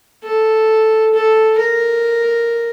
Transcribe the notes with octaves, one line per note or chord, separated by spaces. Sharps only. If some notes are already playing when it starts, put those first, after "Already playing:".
A4
A4
A#4